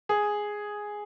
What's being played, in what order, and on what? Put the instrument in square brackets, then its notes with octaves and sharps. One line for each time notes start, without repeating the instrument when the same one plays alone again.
[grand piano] G#4